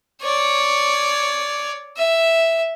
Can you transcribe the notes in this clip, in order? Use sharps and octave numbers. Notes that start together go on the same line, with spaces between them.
C#5 D5
E5